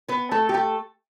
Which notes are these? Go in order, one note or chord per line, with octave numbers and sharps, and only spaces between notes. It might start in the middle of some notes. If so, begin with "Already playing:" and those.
B3 B4
A3 A4
G4
A3 A4